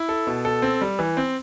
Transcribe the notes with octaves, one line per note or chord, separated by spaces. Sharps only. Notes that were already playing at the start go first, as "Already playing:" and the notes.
Already playing: E4
A4
B2
A4
C4
G3
E3
C4